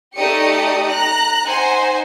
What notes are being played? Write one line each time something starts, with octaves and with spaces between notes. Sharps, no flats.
A3 D#4 G4 D5 D#6 C#7
A#5 F#6
D#4 C5 F#5 G#5 C6